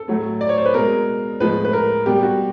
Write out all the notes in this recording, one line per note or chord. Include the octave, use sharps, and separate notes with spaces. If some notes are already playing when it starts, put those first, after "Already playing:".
Already playing: A4
A2 F#3 A3
D5
C#5
C5
B4
B2 G#3 A#4
A2 F3 G#3 B4
B4
A#4
B2 G3 G4
F#4